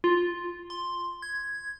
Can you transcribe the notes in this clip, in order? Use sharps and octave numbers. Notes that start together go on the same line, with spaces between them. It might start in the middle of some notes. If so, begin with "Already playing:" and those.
F4
C6
G#6